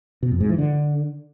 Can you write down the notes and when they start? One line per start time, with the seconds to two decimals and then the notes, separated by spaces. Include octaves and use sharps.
0.23 B2
0.32 F2
0.41 G#2
0.50 E3
0.59 D3